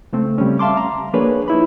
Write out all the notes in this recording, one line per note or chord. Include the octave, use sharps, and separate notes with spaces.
C#3 A3 C4
C#3 G3 A3 C#4
E5 F5 A5 C6 D6
A#5
F3 A#3 D4 G#4 B4 C#5
D#4 E4 B5